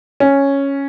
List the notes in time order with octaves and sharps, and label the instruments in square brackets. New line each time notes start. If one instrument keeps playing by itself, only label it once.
[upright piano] C#4